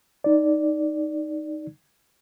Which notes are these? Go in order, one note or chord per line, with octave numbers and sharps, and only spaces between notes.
D#4 D5